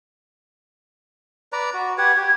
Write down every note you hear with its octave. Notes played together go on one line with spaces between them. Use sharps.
B4 D5 A#5
F#4
G4 B4 F#5 G#6
G4